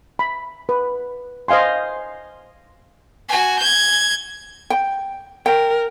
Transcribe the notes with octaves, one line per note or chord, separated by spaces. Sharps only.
B5
B4
C5 D#5 F5 G#5 C6
F#4 G#5
G6 G#6
G5
A#4 G5